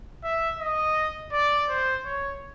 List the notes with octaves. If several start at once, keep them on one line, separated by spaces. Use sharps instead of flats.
E5
D#5
D5
C5
C#5